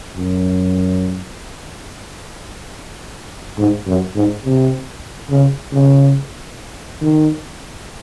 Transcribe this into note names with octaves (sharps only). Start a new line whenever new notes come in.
F#2
G#2
F#2
G#2
C3
C#3
C#3
D#3